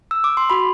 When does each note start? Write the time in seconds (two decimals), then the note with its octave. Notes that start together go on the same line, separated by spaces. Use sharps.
0.11 E6
0.24 D6
0.37 C6
0.50 F#4 B5